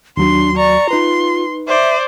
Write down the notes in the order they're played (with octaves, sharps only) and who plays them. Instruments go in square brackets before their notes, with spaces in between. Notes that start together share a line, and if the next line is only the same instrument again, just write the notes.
[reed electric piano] D#2 F#3 F#4 [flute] D4 [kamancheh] C6
[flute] D5 [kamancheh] A#5 C#6
[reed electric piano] D#4 B4 [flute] F4 [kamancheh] C6
[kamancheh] C5 D5 [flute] E5